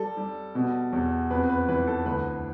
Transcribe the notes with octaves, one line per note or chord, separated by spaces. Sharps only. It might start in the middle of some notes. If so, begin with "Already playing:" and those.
Already playing: G3 A4
G3
B2
E2
F2 B4
B4
E3 B4
A4
D2 B4